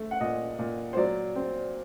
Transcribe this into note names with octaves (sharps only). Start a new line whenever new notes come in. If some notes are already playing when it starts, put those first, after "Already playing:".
Already playing: A3
F#5
A#2 D#5
A#2
C5
F#3 D5
C4